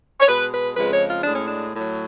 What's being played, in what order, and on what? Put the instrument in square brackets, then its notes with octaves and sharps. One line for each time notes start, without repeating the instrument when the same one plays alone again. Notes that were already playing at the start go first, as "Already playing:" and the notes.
[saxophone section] C#5
B2 G#3 B4
B4
F2 C#3 F3 G#3 B4
C#5
F4
A2 G#3 D4
C#4
D4
A2 F#3